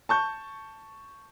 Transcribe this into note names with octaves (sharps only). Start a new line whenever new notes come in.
A5 C#6 G6